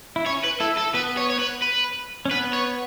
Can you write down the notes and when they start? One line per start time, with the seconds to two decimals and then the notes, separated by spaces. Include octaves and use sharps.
0.16 E4
0.26 C#4 C#5
0.44 B4
0.60 E4 A4
0.77 A4
0.94 B3 B4
1.17 C#5
1.30 C#5
1.39 B4
1.62 B4
2.25 C#4
2.31 B3 B4
2.53 C#5